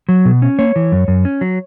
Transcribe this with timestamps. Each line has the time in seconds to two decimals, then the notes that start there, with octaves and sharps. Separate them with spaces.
0.09 F#3
0.25 B2
0.42 C#4
0.59 A#3 C#5
0.76 E3
0.92 F#2
1.08 F#2
1.25 C#4
1.41 F#3